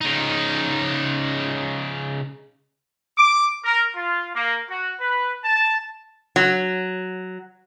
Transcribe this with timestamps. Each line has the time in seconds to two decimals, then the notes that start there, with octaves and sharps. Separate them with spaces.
0.01 C#3 D#4
3.17 D6
3.65 A#4
3.95 F4
4.35 A#3
4.70 F#4
5.00 B4
5.45 A5
6.36 F#3